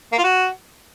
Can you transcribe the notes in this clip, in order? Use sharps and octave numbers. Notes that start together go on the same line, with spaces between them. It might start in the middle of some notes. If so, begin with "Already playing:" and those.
A#3
F4
F#4